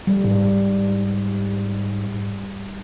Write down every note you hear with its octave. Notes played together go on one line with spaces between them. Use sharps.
G3
G#2